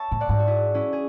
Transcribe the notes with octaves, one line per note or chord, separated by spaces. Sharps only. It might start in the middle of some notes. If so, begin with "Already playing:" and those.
Already playing: C#5 E5 A5
A2
D5 F#5
G#2
F#4
E4 G#4
C#4 E4
G#4